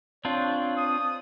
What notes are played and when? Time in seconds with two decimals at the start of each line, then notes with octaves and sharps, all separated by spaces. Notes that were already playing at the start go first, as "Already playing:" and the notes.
0.25 C4 D4 F4 C#5
0.77 D#6